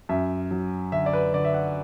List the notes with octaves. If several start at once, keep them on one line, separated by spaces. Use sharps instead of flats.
F#2 E5
F#3
D3 E5
D5
B4
D3 D5
E5
F#5